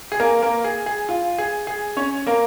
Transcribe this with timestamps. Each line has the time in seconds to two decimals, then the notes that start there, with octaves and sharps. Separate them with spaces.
0.12 G#4
0.20 A#3 A#4
0.42 A#3 A#4
0.64 G#4
0.86 G#4
1.09 F4
1.38 G#4
1.67 G#4
1.97 C#4 C#5
2.27 A#3 A#4